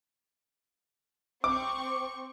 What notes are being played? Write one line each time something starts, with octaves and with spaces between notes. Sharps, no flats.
C4 C#6 D6